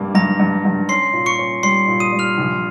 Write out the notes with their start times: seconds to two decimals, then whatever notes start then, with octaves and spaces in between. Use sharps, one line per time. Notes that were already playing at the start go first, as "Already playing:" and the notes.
Already playing: G2 G3 A#3
0.15 G2 A#5 A#6
0.40 G2
0.65 G2
0.89 C#4 C6 C7
1.13 A#2
1.26 C#6 C#7
1.39 C#4
1.63 G3 C6 C7
1.88 A#2
2.00 D#6 D#7
2.13 G3
2.19 F6 F7
2.38 A#1